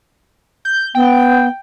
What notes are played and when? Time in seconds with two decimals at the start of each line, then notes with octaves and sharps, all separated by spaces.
0.65 G6
0.95 B3 G5